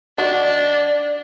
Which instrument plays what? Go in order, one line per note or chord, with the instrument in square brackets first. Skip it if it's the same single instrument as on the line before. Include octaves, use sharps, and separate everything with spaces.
[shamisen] D#3 F#4 [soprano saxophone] D4 [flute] D5